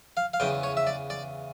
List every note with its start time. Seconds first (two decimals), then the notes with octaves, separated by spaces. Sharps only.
0.17 F5
0.34 F5
0.40 E2 C#3 E3 G5
0.63 C#5
0.77 E5
0.87 D5
1.10 D5